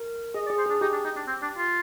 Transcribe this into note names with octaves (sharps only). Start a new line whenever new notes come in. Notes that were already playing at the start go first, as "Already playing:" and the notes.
Already playing: A#4
G#4 D#5
D5
G#4
C5
D4 G#4
D#4 G4
D4
D#4
D4
C4
D4
F4